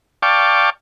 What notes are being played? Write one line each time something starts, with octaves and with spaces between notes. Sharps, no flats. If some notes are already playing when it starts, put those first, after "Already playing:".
D5 F5 G5 A5 C#6 D6